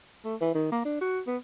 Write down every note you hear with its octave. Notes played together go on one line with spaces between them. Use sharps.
A3
E3
D#3
A#3
D4
F#4
B3